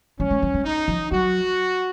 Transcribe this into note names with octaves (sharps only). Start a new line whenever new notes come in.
F#3 C#4
G#3
F#3
G#3
D#4
F3
F#3 F#4